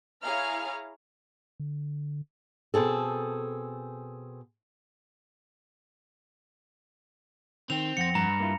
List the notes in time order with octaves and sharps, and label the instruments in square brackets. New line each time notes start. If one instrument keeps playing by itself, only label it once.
[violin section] E4 G#4 C#5 F5 A#5 F6
[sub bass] D3
[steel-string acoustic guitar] B2 C4 G#4 A4
[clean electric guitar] D#3 [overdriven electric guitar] C4 [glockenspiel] F7
[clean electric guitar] F2 F3 F#5 [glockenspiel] A#6 C#7
[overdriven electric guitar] G2 [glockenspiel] A#5
[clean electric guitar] A#3 E4 F4